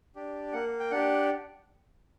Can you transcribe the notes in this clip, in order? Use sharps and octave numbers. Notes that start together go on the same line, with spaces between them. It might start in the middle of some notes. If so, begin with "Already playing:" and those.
D4 G4
A#3 F#5
G5
D4 G4 F#5